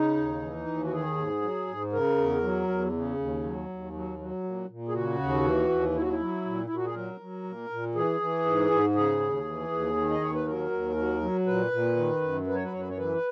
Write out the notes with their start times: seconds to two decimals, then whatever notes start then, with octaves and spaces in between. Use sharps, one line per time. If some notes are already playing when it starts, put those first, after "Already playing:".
Already playing: C#3 D#4
0.17 D#2
0.42 E3
0.67 D#2
0.85 F#4
0.92 D#3 G#4
1.17 G#2
1.42 F#3
1.67 G#2
1.92 C#3 A#4
2.17 E2
2.42 F#3
2.68 E2
2.92 C#3
3.18 D#2
3.43 F#3
3.69 D#2
3.93 F#3
4.18 F#3
4.44 A#2
4.68 A#2
4.88 G#4
4.94 C#3 F#4
5.19 D#2
5.44 E3
5.69 D#2
5.95 F#3 E4
6.02 F#4
6.09 E4
6.19 F#3
6.45 A#2
6.66 A#2 E4
6.76 F#4
6.85 G#4
6.94 F#3 A#4
7.20 F#3
7.44 A#2
7.70 A#2
7.95 E3 G#4
8.20 E3
8.45 G#2
8.71 G#2
8.95 C#3 G#4
9.20 D#2
9.45 E3
9.71 D#2
9.95 D#3
10.10 D#5
10.21 D#2 C#5
10.34 B4
10.46 F#3 A#4
10.71 D#2
10.96 F#3
11.21 F#3
11.46 A#2 B4
11.71 A#2
11.97 D#3
12.21 F#2
12.47 F#3 B4
12.55 C#5
12.64 B4
12.72 F#2 C#5
12.80 B4
12.89 C#5
12.97 E3 B4